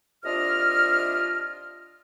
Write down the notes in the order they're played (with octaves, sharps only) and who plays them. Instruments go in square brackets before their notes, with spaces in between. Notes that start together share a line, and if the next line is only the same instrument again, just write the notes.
[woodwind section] C2 D4 F4 D#5 E5 F6